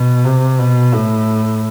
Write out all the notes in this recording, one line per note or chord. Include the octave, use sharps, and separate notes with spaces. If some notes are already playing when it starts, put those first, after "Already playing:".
Already playing: B2
C3
B2
A2